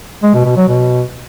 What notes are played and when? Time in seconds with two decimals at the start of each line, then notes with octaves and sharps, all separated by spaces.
0.23 G#3
0.34 B2
0.45 B2
0.57 F#3
0.68 B2